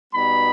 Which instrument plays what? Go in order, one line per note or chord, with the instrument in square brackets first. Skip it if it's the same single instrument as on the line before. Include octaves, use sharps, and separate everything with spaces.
[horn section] B2 G3 B3 D#4 B5